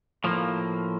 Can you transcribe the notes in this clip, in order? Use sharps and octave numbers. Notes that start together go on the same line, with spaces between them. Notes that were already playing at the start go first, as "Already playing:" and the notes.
A2 F3 A#3